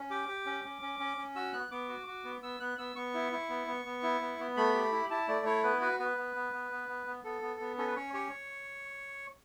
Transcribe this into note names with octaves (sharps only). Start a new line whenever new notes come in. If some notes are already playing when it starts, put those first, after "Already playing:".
Already playing: C#4
G4 D6
G4
C#4
C#4
C#4
C#4
C#4
F#4 E6
B3 F#6
B3 D6
F#4
F#4
B3
B3 E6
B3 F#6
B3 E6
B3 C#6
E4
E4
B3
B3
B3
E4
B3
B3
A3 B5
G4
E4
E4 A5
A3 D5
E4 C#5
B3 B4
F#4 B4
B3 B4
B3
B3
B3
B3
B3
B3
B3 A4
B3
B3
C#4 A4
B4
C#4 C#5
G4 C#5